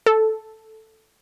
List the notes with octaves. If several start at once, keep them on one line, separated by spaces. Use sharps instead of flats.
A4